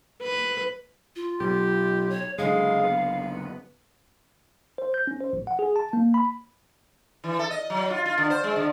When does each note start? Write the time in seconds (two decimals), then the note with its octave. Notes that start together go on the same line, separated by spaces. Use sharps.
0.22 B4
1.16 F4
1.40 B1 G4
2.10 C#5
2.38 F#1 D3 G#3 F5
2.83 B3
4.78 C5
4.94 G6
5.07 C#4
5.20 C5
5.33 A1
5.47 F#5
5.59 G#4
5.76 A5
5.93 A#3
6.14 B5
7.24 E3
7.39 A4
7.50 D#5
7.70 F#3
7.90 F4
8.06 F4
8.18 D3
8.30 C5
8.44 G#3
8.56 D3